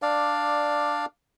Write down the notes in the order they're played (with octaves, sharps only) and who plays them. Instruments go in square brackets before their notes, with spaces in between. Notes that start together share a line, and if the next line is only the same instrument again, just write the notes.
[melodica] D4 D5 F5